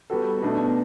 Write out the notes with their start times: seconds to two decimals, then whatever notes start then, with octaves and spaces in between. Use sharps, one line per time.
0.10 G3 B3 F#4 A4
0.42 B2 A3 D4 A4